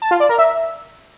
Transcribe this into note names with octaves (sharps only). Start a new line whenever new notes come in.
A5
F4
D5
A#4
E5